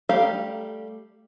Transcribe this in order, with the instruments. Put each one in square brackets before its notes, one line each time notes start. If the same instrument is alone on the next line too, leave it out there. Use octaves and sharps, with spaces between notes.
[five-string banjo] G3 A3 G4 F5 A#5